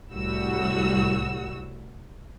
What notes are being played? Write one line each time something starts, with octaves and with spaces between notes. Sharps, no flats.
C2 A2 G3 F#4 E6